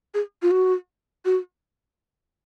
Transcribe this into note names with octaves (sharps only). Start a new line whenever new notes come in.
G#4
F4
F#4
F#4